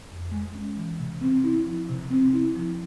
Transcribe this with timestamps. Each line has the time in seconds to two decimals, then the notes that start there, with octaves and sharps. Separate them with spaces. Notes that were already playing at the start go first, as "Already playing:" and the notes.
0.09 F2
0.32 G#3
0.55 C#4
0.77 E3
1.00 C3
1.21 C4
1.44 E4
1.66 F3
1.89 C3
2.11 C4
2.33 E4
2.56 F3